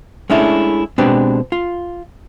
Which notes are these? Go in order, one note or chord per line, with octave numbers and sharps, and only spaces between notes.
G#3 A3 C#4 D4 E4
B2 G#3 C4 D4 G4 B4
F4